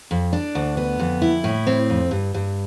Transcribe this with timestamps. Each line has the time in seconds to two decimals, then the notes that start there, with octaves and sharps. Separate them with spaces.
0.11 F2
0.33 D4
0.55 D2
0.77 B3
0.99 F2
1.22 E4
1.44 A2
1.67 C4
1.90 F2
2.11 G2
2.34 G2